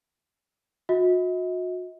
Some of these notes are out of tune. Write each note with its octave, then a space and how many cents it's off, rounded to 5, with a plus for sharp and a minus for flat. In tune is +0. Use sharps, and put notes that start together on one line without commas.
F#4 -40 D#5 +45